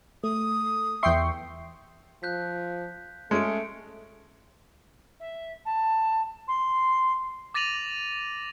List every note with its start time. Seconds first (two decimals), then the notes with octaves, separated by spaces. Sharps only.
0.24 A3 D#6
1.03 E2 E5 G5 C6 C#6 C7
2.23 F3 F#6 G6 B6
3.31 G#3 A3 C#4 C#7 D7
5.20 E5
5.65 A5
6.48 C6
7.54 D6 A6 A#6 D#7 F7 F#7